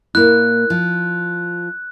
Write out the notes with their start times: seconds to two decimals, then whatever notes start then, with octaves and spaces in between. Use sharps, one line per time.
0.15 A#2 A#3 E4 F#6
0.70 F3